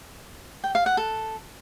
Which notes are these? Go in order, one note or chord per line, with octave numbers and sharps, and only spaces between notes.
G5
F5
F#5
A4